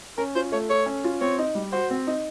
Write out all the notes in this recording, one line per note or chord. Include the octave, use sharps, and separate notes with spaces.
C#4 A#4
F4 C5
A3 C#5
A4 C#5
C#4
F4
C4 C#5
D#4
G3
F#4 C5
C4
D#4